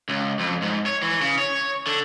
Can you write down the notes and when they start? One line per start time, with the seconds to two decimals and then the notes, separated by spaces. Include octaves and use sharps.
0.09 C#2
0.39 F2
0.62 G#2
0.86 C#5
1.02 E3
1.21 C#3
1.38 C#5
1.87 D3